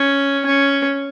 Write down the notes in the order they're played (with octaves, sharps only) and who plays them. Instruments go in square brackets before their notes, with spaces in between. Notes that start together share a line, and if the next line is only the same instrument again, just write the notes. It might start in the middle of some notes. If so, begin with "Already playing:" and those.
Already playing: [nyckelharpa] C#4
C#4